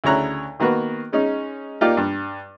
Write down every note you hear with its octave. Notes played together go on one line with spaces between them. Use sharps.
D2 C#3 E4 C#5 A#5 F#6
D#3 A#3 B3 F#4 B4
G#3 C#4 D#4
A#3 D#4 F4 G4 D5
G2